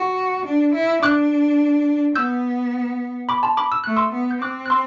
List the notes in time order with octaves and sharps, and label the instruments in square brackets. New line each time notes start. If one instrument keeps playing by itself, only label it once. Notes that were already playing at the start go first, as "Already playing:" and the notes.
Already playing: [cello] F#4
D4
E4
[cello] D4 [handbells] D6 F#6
[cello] B3 [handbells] E6 G6
[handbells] B5 D6
A5 C6
B5 D6
E6
[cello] A3 [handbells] F#6
[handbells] C6 E6
[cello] B3
[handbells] G6
[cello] C4 [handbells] D6 F#6
[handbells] F#6
C6 E6